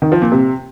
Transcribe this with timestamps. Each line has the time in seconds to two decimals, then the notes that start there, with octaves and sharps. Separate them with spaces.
0.02 D#3
0.12 F3
0.22 A#2
0.32 C3